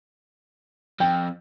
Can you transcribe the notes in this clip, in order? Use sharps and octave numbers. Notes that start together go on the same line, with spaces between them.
F2 G5